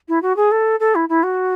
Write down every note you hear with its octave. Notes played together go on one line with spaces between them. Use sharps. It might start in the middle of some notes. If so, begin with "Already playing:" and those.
E4
F#4
G#4
A4
A4
E4
E4
F#4